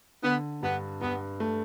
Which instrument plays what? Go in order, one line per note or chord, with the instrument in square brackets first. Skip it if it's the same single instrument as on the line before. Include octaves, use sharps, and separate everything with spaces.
[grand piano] D3 [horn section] B3
[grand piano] G2 [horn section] B3
[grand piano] G2 [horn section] B3
[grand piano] A3